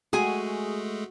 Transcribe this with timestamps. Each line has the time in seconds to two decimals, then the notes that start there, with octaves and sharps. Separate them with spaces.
0.13 G#3 A3 F#4 G#4 G#5